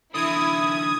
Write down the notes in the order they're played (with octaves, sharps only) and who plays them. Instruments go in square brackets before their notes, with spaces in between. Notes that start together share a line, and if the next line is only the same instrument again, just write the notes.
[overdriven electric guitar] D3 E3 [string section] E4 [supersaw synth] D#6 G#6